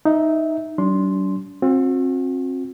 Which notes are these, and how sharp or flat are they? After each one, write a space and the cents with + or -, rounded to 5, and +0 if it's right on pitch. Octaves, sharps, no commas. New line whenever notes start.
D#4 +0 E5 -15
F#3 +45 D4 -35 C6 +0
C4 +30 F#4 -40